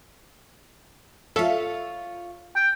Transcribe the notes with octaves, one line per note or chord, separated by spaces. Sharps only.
F4 A4 C#5 E5 F5
G5